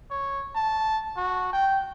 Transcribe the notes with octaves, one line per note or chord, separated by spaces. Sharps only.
C#5
A5
F#4
G5